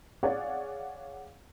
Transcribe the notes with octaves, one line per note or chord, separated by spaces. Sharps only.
G#4 C#5 D5 F5 F#5